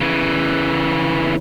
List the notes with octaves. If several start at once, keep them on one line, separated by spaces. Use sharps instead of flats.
C#3 E3